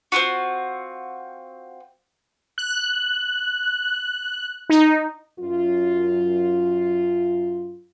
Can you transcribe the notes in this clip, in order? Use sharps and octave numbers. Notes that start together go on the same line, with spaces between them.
C4 D4 F4 F#4
F#6
D#4
F#2 F4